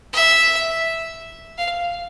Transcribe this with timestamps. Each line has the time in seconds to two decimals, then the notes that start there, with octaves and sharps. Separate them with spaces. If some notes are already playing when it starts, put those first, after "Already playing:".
0.13 E5
1.58 F5